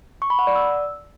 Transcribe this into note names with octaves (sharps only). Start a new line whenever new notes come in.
C#6
B5
F#5
D5
E6